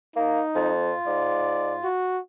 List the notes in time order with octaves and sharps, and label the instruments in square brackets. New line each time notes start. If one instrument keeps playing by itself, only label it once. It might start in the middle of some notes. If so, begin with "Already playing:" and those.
[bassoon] A#3 [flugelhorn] D#4
[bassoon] F2 [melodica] F4
[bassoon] G#2 [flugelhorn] D5
[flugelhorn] F#4